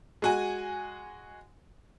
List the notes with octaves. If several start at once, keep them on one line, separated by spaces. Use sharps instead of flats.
G#3 F#4 G#5